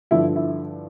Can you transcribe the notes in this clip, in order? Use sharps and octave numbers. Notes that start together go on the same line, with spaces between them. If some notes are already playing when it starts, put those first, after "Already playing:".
G2 D3 F3 E4
E4